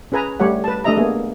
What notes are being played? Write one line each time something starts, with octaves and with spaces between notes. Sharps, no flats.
C#4 G#4 B4 G#5 A#5
G3 A3 G4 C#5 F#5
B4 A5
A3 D4 G4 D#5 E5 A#5
A#3 B3 G#4